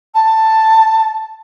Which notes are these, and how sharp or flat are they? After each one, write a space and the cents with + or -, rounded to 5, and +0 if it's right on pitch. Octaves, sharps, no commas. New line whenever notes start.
A5 +10